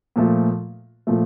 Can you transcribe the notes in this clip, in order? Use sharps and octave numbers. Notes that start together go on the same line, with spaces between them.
A#2 F3 A3
A#2 F3 A3